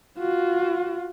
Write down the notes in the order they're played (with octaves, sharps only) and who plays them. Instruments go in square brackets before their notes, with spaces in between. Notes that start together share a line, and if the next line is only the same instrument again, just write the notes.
[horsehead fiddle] F4 F#4